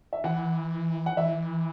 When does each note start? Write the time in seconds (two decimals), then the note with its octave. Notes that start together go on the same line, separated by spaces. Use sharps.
0.13 E5
0.24 E3 F#5
1.06 F#5
1.17 E3 E5